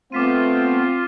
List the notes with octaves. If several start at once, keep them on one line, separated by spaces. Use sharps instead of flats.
A3 B3 C4 F4 D6 B6 D#7